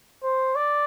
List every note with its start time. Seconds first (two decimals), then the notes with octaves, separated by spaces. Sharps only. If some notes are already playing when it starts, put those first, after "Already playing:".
0.23 C5
0.55 D5